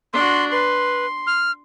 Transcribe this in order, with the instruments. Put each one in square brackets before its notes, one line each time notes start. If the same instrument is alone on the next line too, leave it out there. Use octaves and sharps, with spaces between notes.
[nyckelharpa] D4 F#4 [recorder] C6
[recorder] B4 [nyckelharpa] C6
[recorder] F6